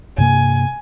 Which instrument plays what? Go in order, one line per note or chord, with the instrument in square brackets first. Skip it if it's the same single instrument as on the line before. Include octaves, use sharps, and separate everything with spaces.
[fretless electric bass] G2 C3 A#3 [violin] G#5